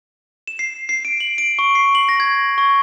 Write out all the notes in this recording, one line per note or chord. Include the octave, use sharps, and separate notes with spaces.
E7
C7
C7
D7
F#7
D7
C#6
C7
F#7
A#6
G#6
C#6